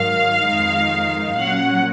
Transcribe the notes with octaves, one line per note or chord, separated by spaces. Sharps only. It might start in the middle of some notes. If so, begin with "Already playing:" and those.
Already playing: G#2 D#3 F#3 F5
F2 D#3 G#3 D#4
A#2 F#3 C#4 F#5